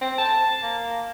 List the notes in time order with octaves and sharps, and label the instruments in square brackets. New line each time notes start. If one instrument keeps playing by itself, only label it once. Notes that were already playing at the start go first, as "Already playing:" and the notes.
[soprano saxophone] C4
A5
A#3